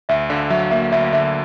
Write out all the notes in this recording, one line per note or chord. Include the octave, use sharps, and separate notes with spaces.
D2 E5
D3 F5
F#3 E5
F5
A#3 E5
F5
D2 E5
F5
D3 E5